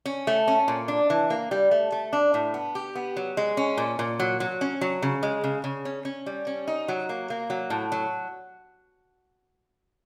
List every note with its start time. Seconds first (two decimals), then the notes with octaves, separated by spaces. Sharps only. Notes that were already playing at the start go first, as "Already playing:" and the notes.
0.06 C#4
0.27 A3
0.48 C#4
0.68 A#2
0.88 D4
1.10 E3
1.30 A#3
1.51 G3
1.71 A3
1.92 A3
2.13 D4
2.34 A2
2.54 B3
2.75 G4
2.95 B3
3.17 F#3
3.37 G#3
3.57 C#4
3.78 A#2
3.99 A#2
4.20 F#3
4.40 F#3
4.61 C#4
4.81 F#3
5.02 C#3
5.23 G#3
5.44 C#3
5.64 C#3
5.85 C#4
6.05 C#4
6.26 G3
6.47 C#4
6.67 D#4
6.88 F#3
7.09 A#3
7.30 A#3
7.50 F#3
7.70 A2
7.92 F#3